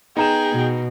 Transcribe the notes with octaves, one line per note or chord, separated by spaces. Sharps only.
B3 D#4 G#4 G5 A#5 E7
B2